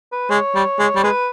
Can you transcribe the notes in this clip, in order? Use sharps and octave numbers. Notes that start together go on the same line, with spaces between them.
B4
G#3 C#5
G3
G#3
G3
G#3 B4